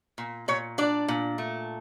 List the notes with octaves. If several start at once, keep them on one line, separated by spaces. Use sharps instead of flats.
A#2
A#2 C#5
D4 D5
A#2
A3